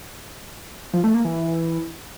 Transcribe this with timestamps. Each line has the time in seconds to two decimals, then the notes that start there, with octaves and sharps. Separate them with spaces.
0.93 F3
1.04 A3
1.14 A#3
1.25 E3